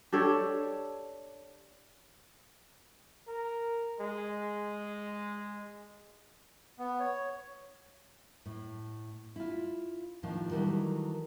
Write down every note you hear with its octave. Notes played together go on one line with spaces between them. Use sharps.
D4 G4 A4 C#5
A#4
G#3
B3
C#5
A2
E4 F4
D#2 A2 D#3 F3 D4 F5
D#3 E3 F#3 G3 A3 E4